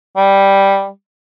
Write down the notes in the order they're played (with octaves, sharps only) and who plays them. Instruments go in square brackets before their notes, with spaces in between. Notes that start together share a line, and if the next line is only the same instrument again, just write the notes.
[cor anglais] G3